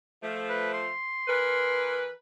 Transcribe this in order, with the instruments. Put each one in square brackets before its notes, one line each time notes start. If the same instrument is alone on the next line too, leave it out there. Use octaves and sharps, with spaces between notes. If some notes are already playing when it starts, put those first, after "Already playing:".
[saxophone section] F3 A3
[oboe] B4
C6
[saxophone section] E3 A#4 B4